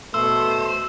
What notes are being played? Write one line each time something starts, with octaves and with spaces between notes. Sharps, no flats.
B2 A3 C5 E6